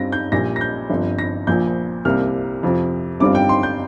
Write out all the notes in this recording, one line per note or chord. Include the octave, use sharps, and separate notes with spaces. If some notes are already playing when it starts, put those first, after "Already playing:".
Already playing: G2 G3 C4 F4 A#6
G6
A#1 A#2 G3 A#6
A#6
G6
G1 G2 F3 C4
A#6
A#1 A#2 F3 G6
C2 C3 G3 A#3 F6
F2 C3 F3
G1 G2 G3 C4 F4 D6
G5
C6
G6